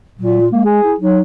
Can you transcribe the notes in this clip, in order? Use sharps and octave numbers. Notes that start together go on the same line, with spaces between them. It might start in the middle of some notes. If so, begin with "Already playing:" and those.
A#2 F#3
F4
G#3 A#3
G#4
E4
F#3 D#4